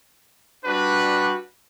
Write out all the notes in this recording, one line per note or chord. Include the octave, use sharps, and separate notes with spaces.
G3 D4 F#4 B4